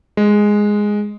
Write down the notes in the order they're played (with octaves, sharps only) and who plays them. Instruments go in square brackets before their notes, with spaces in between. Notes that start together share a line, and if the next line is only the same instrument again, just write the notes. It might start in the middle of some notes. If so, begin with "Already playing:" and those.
[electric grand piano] G#3